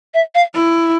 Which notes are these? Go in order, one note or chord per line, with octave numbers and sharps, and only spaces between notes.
E5
F5
E4